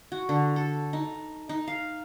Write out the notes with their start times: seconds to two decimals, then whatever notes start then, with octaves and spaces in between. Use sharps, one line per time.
0.12 F#4
0.29 D3
0.56 A4
0.93 D#4
1.49 D#4
1.68 F5